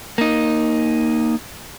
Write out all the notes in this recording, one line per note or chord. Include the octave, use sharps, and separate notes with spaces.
A#3 D#4